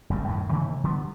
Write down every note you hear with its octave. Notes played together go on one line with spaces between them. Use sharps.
F#1 C2 G2 A3
F#2 A2 C3 D#3
C3 D#3 A3 A#3
D3 F#3 G3 B3